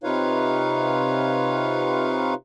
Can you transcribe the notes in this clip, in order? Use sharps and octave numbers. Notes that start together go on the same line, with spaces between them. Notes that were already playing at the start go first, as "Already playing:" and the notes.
C3 D#4 F4 B4 C#5 F5